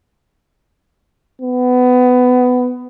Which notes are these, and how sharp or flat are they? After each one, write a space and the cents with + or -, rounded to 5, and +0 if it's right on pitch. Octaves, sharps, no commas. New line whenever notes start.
B3 +20